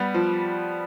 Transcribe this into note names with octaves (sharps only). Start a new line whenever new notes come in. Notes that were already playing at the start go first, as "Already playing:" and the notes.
Already playing: G3 B3
F3